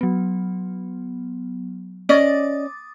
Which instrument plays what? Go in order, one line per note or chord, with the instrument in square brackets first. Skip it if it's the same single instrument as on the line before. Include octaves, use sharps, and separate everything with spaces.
[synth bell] F#3 B3
[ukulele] C#4 D5 D#5 [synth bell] D6 D#6 A6